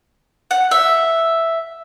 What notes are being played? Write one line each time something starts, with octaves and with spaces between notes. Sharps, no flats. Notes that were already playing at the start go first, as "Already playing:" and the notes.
F#5
E5